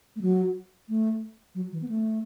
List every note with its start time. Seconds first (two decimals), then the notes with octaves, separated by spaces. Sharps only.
0.16 A3
0.22 F#3
0.89 A3
1.55 F#3
1.72 E3
1.82 B3
1.89 A3